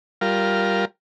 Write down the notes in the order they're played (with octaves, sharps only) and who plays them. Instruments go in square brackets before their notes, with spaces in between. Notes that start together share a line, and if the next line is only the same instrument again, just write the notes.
[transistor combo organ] G3 F4 A#4